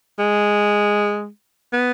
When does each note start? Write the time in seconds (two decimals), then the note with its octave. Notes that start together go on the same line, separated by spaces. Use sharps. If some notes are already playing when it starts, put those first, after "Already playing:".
0.19 G#3
1.73 B3